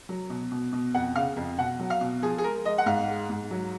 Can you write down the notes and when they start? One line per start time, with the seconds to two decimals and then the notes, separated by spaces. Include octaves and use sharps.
0.09 F#3
0.30 B2
0.52 B2
0.73 B2
0.94 F2 F#5
1.16 C#3 F5
1.36 F2
1.58 B2 F#5
1.79 F#3
1.90 F5
2.01 B2
2.22 F3 G#4
2.38 G#4
2.44 G#3 A#4
2.65 G#3 D#5
2.78 F#5
2.86 G#2 F5
3.08 G#3
3.29 G#2
3.51 F#3